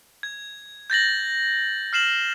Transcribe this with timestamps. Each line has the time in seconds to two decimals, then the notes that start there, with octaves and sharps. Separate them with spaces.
0.23 G#6
0.90 G6 A6 A#6 F#7
1.93 F6 C7 E7 F#7